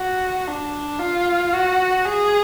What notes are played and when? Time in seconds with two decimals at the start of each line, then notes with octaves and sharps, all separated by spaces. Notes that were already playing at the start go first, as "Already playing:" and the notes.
Already playing: F#4
0.47 D4
0.99 F4
1.53 F#4
2.05 G#4